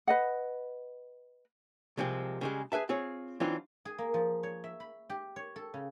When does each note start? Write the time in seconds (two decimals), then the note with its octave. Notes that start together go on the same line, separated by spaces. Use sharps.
0.07 B4 D#5 F#5
1.97 C2 C3 F3 G#3 C4
2.41 C#3 G3 G#3
2.72 G#4 B4 E5 A5
2.89 C4 F4 G#4 C#5
3.40 E3 F#3 C4 D4 D#4 F4
3.85 G#4
3.98 A#3
4.14 F3
4.43 C#5
4.64 E5
4.80 B5
5.10 G4
5.36 C#5
5.56 A4
5.74 C#3